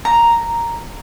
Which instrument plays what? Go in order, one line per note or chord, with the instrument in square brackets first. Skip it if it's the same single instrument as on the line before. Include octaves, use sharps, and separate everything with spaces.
[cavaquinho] A#5